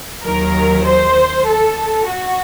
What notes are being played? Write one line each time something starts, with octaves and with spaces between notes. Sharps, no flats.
D#2 D#3 F#3 A#4
C5
A4
F#4